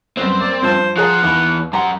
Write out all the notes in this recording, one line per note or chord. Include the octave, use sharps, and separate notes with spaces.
F#2 G3 B3 C4
A#3 D5
G2 F3 C5 A5
F3 F4 G#4 F#5 A#5
D#2 E3 B3
F#2 G4 F#5 A#5 C6